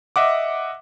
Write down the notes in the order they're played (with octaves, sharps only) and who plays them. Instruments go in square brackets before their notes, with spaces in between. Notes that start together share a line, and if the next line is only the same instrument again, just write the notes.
[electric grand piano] D#5 E5 F#5 D6